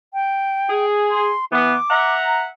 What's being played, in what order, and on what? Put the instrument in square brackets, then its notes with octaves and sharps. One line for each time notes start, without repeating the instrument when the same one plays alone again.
[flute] G5
[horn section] G#4
[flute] C6
[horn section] E3 B3 [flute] D6
[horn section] E5 F#5 A#5